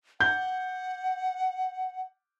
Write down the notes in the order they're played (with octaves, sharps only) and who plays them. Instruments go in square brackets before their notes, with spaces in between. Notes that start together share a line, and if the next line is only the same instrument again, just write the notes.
[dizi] F#5 [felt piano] G6